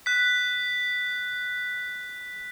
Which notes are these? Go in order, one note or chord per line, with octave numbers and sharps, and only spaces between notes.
F#6 B6